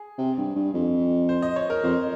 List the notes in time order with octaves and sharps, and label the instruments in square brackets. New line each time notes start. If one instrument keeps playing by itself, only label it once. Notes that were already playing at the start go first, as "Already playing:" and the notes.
Already playing: [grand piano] G#4
[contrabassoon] C3
G2
G2
F2
[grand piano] C5
D#5
C#5
A#4
[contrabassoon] F2 [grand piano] C5